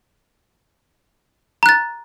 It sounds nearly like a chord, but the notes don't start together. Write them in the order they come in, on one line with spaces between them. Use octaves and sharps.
A#5 F#6 A6